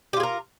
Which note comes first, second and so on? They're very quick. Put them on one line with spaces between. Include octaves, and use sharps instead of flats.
G4 F4 G#4 A#4